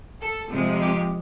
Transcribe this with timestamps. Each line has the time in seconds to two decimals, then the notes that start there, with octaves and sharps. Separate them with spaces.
0.21 A4
0.51 F2 C3 F3 G#3
0.81 G4